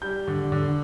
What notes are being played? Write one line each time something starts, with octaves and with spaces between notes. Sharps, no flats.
G3 G6
D3
D3